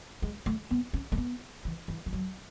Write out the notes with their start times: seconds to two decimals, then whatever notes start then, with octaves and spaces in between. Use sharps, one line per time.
0.22 G#3
0.46 A3
0.71 B3
0.93 C#4
1.12 A3
1.17 B3
1.65 E3
1.88 E3
2.06 E3
2.13 F#3